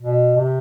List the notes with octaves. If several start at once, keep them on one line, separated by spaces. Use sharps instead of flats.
B2
C3